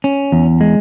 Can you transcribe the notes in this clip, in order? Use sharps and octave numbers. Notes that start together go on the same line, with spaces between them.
C#4
E2
G#3